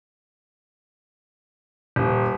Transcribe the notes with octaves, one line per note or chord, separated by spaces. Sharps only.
D#1